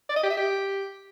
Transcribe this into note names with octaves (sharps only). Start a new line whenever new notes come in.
D5
D#5
G4
E5
G4